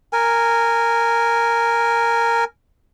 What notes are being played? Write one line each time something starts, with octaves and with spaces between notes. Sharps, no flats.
A#4 G#5